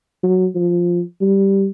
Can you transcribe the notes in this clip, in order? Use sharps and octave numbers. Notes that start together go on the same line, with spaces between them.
F#3
F3
G3